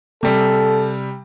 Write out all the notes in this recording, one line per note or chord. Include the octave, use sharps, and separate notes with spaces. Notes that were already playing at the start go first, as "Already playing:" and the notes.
C3 G3 A4